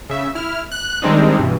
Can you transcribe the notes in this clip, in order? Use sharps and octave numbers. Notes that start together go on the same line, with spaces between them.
C#3 E5
E4 F6
F#6
D#3 G3 G#3 C4 D4 D#4
G2 B2 E3